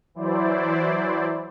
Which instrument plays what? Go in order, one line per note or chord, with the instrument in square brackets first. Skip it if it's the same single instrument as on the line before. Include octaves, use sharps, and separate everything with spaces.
[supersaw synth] E3 F#3 E4 C5 D5